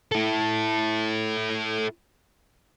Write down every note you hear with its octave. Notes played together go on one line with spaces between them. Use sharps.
E4 A4